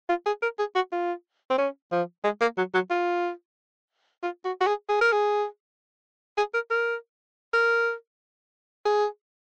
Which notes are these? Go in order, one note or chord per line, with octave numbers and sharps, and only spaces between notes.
F4
G#4
A#4
G#4
F#4
F4
C4
C#4
F3
G#3
A#3
F#3
F#3
F4
F4
F#4
F#4
G#4
G#4
A#4
G#4
G#4
A#4
A#4
A#4
G#4